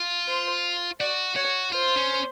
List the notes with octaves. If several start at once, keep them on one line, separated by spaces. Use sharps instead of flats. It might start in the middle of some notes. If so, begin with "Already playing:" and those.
Already playing: F4
C5
F#4 D5
F#4 C#5
F4 C5
C#4